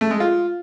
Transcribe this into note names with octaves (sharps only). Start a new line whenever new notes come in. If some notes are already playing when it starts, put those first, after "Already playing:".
A3
G#3
F4